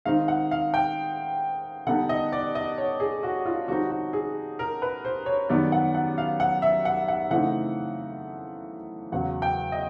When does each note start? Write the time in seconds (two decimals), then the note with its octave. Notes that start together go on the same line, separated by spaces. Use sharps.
0.05 D#3 G#3 C4 D#4 F5
0.28 F#5
0.51 F5
0.74 G5
1.87 D3 G3 B3 D#4 F#5
2.09 D#5
2.32 D5
2.55 D#5
2.78 C#5
3.00 G#4
3.23 F#4
3.46 F4
3.68 D3 G3 C4 D#4 F#4
3.90 F#4
4.13 G#4
4.59 A#4
4.82 B4
5.05 C5
5.26 C#5
5.49 F#2 D#3 G3 B3 D5
5.72 F#5
5.94 F#5
6.18 F5
6.40 F#5
6.62 E5
6.85 F#5
7.08 F#5
7.30 C#3 E3 A3 C4 D#4 F#5
9.12 E2 C#3 F#3 F#5
9.42 G5
9.72 D#5